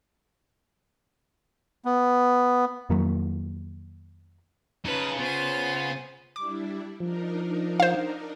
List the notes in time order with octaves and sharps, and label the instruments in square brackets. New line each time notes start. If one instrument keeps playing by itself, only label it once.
[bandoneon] B3
[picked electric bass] F2 D#3 F#3 A#3
[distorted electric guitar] C#3 [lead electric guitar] D#4 F4 [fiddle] B4 A5
[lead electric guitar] B3 [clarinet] F4 [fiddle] C5 G#5
[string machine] G3 D4 E4 [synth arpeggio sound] D6
[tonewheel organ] F3 [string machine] D4 D#4 A#4
[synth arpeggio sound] C5 F5